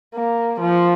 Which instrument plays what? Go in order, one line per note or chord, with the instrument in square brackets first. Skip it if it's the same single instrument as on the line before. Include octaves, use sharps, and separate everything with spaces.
[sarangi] A#3
F3